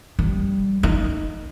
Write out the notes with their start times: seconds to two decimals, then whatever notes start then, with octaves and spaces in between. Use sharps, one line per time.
0.19 G3
0.83 D#4